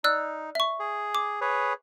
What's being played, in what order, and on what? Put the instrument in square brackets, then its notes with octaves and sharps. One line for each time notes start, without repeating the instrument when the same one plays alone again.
[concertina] D#4 [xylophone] D5 E6 F#6
[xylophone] E5 C#6
[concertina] G#4
[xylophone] D6
[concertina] G#4 B4 C#5